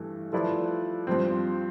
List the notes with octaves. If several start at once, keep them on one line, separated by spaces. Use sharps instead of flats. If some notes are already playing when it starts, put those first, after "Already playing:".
Already playing: G2 E3 A3
F3 A3 E4 B4 D5
G2 F3 C4